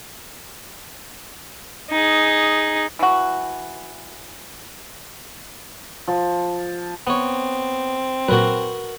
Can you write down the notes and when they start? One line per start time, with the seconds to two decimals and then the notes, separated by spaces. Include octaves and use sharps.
1.91 D#4 G#4
2.99 E3 F#4
6.07 F3
7.07 B3 C4 C#5
8.28 A#2 F#3 F#4 A#4 B4